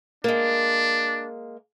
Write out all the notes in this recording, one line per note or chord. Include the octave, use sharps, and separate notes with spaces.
G#3 A#3 D4